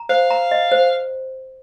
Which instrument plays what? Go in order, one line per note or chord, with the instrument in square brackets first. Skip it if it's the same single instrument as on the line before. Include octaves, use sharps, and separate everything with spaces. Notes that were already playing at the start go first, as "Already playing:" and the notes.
Already playing: [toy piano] A#5
[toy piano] C5 [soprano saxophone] F5
[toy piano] A#5
D#5
C5